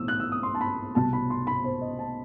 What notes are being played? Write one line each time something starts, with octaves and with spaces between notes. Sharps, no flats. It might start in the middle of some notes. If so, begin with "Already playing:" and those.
Already playing: B1 A2 E3 D#6 E6
F#6
E6
D#6
C6
A5
B5
C2 B2 G3 A5
B5
C6
B5
C5
D#5
A5